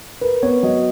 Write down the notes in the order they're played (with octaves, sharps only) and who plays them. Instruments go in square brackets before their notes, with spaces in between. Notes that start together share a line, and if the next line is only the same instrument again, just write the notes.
[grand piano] A#4 [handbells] B4
[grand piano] B3 [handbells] C#5
[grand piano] F#3 [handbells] D#5